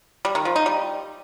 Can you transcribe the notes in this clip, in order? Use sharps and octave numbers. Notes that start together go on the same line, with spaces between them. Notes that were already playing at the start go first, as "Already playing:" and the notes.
G3
D#3
F3
D#4
G3